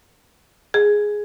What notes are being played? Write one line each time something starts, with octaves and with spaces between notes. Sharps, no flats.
G#4